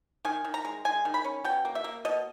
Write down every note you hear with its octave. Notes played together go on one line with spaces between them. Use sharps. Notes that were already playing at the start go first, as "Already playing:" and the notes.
D#3 G#5
D#3
A#5
G#3
G#3 G#5
D#3
B5
C#4
B2 G5
A#3
E5
A#3
B2 D#5